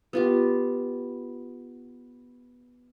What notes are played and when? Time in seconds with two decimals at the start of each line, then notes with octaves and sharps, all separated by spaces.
0.13 B3 F4 G4